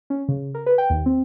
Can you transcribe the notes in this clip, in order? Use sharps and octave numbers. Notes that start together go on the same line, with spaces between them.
C#4
C#3
A#4
B4
G5
D#2
C4